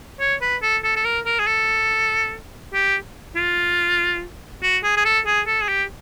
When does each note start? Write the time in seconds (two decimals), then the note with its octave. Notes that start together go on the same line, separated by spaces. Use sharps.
0.20 C#5
0.42 B4
0.62 A4
0.84 A4
0.96 A4
1.05 A#4
1.26 A#4
1.39 G#4
1.47 A4
2.74 G4
3.36 F4
4.63 F#4
4.84 G#4
4.97 G#4
5.05 A4
5.26 G#4
5.47 A4
5.61 G#4
5.68 G4